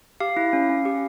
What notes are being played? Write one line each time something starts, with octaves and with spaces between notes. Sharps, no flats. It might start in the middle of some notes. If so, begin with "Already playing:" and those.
G4 F5
E4
C#4
C#4
G4